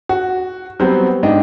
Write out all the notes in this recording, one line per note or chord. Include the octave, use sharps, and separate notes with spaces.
F#4
F#3 G3 B3 C4 C5
G#2 D4 D#5 G5